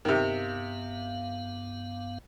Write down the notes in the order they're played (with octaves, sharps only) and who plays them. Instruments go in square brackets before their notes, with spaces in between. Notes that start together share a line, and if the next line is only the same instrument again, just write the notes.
[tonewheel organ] G2 B3 F5 [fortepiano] C3 D#3